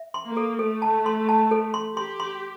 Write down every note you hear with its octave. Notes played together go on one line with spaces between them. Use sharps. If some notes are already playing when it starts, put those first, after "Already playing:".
Already playing: E5
C6
A#3
A4
A3 A4
A5
C6
A5
A4
C6
G4 C6
C6